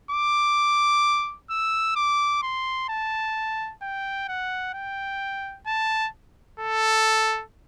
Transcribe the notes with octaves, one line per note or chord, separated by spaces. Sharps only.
D6
E6
D6
C6
A5
G5
F#5
G5
A5
A4